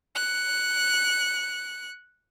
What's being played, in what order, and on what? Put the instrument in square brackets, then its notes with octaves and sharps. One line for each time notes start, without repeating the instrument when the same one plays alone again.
[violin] F#6 C#7